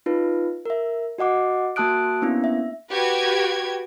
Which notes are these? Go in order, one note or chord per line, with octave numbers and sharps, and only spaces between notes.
D#4 F4 B4
A#4 E5
F#4 D#5 F#5 D6
A#3 F#4 A5 D#6 F#6 D7
A#3 B3 C#4 D4 E4
E5
F#4 G4 B4 G5 G#6